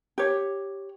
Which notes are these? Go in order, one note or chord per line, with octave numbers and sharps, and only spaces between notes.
G4 C#5